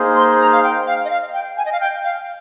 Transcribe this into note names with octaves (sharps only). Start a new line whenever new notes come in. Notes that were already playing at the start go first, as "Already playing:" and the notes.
Already playing: A#3 D#4 G#4 C5
C6
A#5
F5
G5
F5
D#5
F5
G5
G#5
D#5
F5
G5
F5